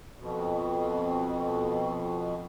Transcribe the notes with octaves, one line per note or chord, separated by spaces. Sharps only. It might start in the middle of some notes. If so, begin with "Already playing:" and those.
F2 B2